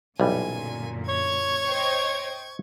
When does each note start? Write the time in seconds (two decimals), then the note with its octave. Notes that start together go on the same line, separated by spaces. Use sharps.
0.20 B1 F#2 A#2 D3 E3 G3 G#5
1.09 C#5 C#6 G#6
1.66 C5 D#5 G5